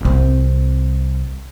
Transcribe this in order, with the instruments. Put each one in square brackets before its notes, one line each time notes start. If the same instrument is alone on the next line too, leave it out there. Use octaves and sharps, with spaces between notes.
[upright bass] C2 C4